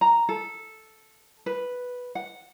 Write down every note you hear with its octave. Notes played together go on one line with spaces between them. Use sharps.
A#5
A4
B4
F#5